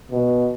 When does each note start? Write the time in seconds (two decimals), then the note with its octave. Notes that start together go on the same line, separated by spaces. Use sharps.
0.11 B2